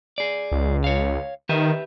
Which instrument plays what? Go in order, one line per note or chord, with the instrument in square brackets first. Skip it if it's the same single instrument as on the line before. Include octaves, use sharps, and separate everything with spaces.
[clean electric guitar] G#4 D5
[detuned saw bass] C#2
[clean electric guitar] C#5 F5
[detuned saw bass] D#3 [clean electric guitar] G4 B4 E5